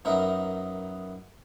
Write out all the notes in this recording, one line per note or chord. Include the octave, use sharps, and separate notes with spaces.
F#2 B3 D#4 A#4 E5